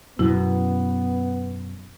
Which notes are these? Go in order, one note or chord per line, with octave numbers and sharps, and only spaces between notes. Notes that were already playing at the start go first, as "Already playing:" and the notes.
F#2 B2 B3 E4